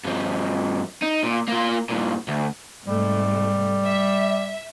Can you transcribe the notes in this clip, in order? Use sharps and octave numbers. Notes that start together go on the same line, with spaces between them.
G2 F3
D#4
A#2
A#3 F4
G2 A#2
D2
G#2 C3 G3 A3
E5